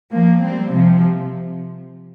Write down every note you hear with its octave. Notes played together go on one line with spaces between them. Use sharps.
F3 A#3
G3 C4
C3 F3